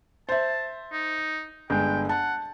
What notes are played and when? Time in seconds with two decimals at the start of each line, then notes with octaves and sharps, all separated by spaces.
0.29 C5 E5 A5
0.92 D#4
1.70 G1 G#3 G5
2.09 F#5 A5